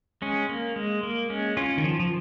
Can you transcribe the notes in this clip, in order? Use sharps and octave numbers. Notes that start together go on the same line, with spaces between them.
G#3 C#4
A#3
G#3
A#3
G#3 C#4
C#4 F4
D#3
F3
F3